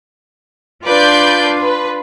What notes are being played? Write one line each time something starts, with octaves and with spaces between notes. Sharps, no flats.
D4 F4 B4 D5 G6
B4